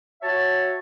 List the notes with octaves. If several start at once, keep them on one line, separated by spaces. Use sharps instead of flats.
F#4 C#5 E5 A5